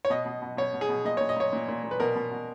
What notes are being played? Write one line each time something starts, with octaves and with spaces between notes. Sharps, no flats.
C#5
B2 D#5
B2
B2
B2 C#5
B2
G#4
B2
A#2 D#5
A#2 C#5
D#5
A#2 C#5
A#2
A#2
A#2
B4
B2 A#4
B2
B2